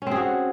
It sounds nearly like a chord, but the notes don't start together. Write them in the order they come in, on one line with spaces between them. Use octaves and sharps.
C#4 C4 G#4 F#4